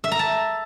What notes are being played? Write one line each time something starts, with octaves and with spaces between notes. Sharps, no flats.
E5
A#5
A5